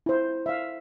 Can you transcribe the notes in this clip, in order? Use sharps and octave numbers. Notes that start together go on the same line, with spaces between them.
E4 C5
E5 F5